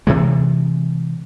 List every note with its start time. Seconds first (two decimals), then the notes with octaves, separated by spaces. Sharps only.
0.07 C3 E3 G#3